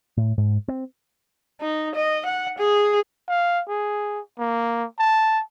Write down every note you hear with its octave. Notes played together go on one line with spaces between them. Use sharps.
A2
G#2
C4
D#4
D#5
F#5
G#4
F5
G#4
A#3
A5